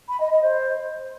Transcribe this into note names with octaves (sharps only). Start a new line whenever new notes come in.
B5
D#5
D#5
C5